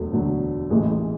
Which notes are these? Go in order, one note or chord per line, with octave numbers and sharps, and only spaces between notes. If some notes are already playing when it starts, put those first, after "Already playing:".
Already playing: E1 D2 D3 F#3 A3
E1 D2 D3 F#3
A1 A2 E3 G#3
G#3